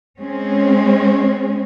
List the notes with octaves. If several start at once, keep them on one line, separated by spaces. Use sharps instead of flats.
G#3 C4 C#4